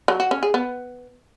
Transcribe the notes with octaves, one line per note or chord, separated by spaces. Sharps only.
F#3
F#4
C#4
G#4
B3